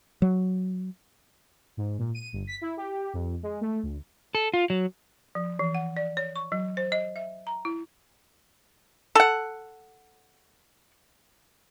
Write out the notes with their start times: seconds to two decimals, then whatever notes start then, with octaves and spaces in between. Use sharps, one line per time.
0.22 F#3
1.77 G#2
1.98 A#2
2.14 D#7
2.33 G1
2.47 B6
2.61 E4
2.77 G4
3.13 F2
3.43 G#3
3.61 A3
3.83 D2
4.35 A4
4.54 F4
4.70 F#3
5.35 F3
5.59 E3
5.75 F#5
5.97 D5
6.17 C#5
6.36 C#6
6.52 F#3
6.77 C5
6.92 D#5
7.16 E5
7.47 A#5
7.65 E4
9.15 A4 F#5